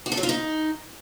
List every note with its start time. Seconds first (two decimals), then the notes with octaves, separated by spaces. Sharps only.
0.06 F#4
0.12 A4
0.17 F#3
0.23 F4
0.29 D#4